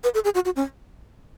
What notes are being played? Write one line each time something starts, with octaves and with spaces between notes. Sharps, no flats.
B4
A4
G#4
F#4
F#4
C#4